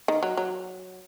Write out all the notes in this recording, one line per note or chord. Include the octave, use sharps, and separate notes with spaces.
D#3
F#3
F#3